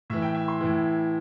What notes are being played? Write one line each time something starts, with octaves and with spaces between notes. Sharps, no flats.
A2 E3 E5
G5
E5
C6
A2 E3